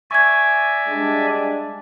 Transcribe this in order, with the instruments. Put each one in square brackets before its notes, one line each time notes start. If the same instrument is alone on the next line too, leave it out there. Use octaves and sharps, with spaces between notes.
[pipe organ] D5 E5 G#5 [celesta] C#6 G#6
[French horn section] G3 G#3 D4